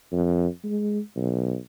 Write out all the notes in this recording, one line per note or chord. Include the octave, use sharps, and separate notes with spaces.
F2
G#3
B1